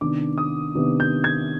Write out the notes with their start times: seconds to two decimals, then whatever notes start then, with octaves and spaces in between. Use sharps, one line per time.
0.01 C3 D#3 B3 D4 D6
0.38 D#6
0.75 C3 D#3 B3 D4
1.00 G6
1.24 G#6